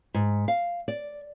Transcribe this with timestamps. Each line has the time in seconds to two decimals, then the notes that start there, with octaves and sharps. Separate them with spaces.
0.14 G#2
0.48 F5
0.88 D5